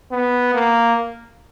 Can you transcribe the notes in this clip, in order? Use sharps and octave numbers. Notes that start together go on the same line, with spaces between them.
B3
A#3